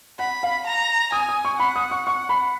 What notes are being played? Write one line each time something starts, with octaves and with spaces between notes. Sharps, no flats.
F#5 B5
F5
A#5
G#5 D#6
D#6
C#6
F#5 B5
D#6
C#6
F#5 C#6
B5